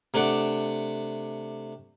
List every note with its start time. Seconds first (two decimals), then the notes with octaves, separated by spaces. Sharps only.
0.14 C3 A3 D4 F#5 D6